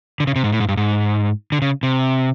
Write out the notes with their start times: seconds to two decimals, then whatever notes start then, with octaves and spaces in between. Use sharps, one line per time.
0.20 D3
0.27 C#3
0.36 C3
0.44 G#2
0.52 A2
0.60 G#2
0.68 G2
0.77 G#2
1.52 D3
1.62 C#3
1.83 C3